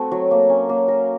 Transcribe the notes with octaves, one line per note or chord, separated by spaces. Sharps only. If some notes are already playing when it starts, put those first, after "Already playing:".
Already playing: A3 C4 F#4
F#3
A#3
C#4
A#3
A#4